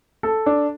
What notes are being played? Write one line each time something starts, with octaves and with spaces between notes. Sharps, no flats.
A4
D4